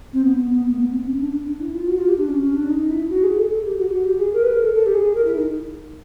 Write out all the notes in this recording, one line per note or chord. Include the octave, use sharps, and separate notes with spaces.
C4
B3
B3
B3
A#3
B3
C4
C#4
D4
D4
D4
E4
F4
F#4
F4
G4
D4
C#4
C#4
D4
D#4
E4
F#4
G#4
A4
A4
G4
F#4
G4
F#4
G4
G#4
A#4
B4
A#4
A4
A4
G4
G#4
A#4
E4
D#4